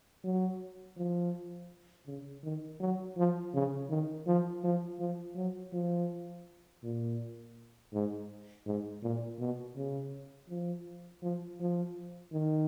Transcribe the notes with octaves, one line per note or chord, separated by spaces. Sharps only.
F#3
F3
C#3
D#3
F#3
F3
C#3
D#3
F3
F3
F3
F#3
F3
A#2
G#2
G#2
A#2
B2
C#3
F3
F3
F3
D#3